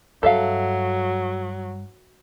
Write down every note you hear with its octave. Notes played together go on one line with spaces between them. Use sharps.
G2 F#3 A4 E5 F5